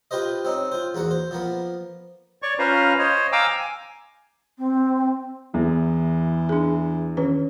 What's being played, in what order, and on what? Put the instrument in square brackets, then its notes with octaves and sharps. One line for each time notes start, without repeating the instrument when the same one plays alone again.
[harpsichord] F4 G4 B4 C5 D#5
C4 C#4 D#4
F4 C5
E2 A#3 F#4 F#5
C5
F3 A#3 B3
[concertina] C#5 D5 C#6
C#4 F4 B4 C5 F5 A#5
C5 C#5 D#5
F5 G5 G#5 A#5 D6 E6
G#5
[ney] C4
[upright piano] E2 [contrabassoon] E3
[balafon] D4 G#4
D#3 C#4 B4